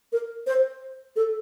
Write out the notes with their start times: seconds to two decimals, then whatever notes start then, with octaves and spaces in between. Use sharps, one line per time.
0.12 A#4
0.47 C5
1.16 A4